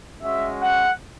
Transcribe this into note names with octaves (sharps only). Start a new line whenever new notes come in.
G#3 C#4 F#4 E5
F#5